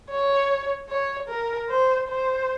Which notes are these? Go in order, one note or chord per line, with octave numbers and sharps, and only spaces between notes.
C#5
C#5
A#4
C5
C5